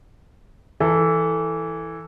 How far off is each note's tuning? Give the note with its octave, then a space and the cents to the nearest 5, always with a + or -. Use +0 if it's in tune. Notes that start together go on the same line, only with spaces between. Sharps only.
E3 +0 A4 +5